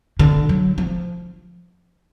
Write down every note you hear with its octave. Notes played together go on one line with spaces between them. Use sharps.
D3
F#3
F3